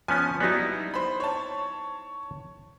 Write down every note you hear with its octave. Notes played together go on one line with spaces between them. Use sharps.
F3 B3 C#4 G#5
F#3 G3 B3 D#4 E4
C5 B5
C#5 A5